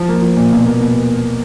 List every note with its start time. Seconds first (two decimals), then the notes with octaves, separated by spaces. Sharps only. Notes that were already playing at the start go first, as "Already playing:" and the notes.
Already playing: F3
0.09 A#3
0.22 F3
0.37 A#2
0.52 B2
0.66 A#3
0.80 B2